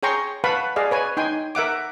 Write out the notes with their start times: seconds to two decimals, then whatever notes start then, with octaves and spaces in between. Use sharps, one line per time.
0.03 G#4 C#5 G5 A#5 C6 C#6
0.44 B4 F5 F#5 A5 B5 C#6
0.76 G#4 D5 D#5 F5
0.91 B4 C#5 G#5
1.17 D#4 G5 G#5 C6
1.55 A#4 E5 F#5 D6